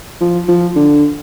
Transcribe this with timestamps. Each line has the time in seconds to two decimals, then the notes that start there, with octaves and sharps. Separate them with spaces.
0.21 F3
0.48 F3
0.76 D3